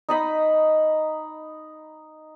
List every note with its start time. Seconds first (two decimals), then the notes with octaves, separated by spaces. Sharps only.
0.09 D#4 D#5 B5